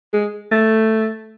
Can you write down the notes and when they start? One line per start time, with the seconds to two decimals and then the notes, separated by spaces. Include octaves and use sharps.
0.13 G#3
0.51 A3